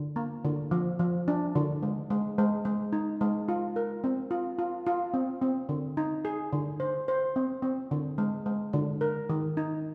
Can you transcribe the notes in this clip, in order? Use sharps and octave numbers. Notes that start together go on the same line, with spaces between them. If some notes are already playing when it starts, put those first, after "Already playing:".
Already playing: D3
A#3
D3
F3
F3
D4
D3
G#3
G#3
G#3
G#3
D#4
G#3
F4
A#4
C4
F4
F4
F4
C4
C4
D3
D#4
G#4
D3
C5
C5
C4
C4
D3
G#3
G#3
D3
A#4
D#3
D#4